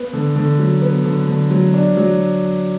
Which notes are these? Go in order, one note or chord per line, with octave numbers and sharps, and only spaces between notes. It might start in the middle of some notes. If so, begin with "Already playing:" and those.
Already playing: B3
D3
D3
F#3
B3
D3
D3
F#3
D4
F#3